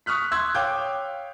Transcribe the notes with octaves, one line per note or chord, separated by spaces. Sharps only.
C#6 D#6 F6 F#6 B6
C6 E6 F#6 G#6
C#5 F5 G5 D6 G6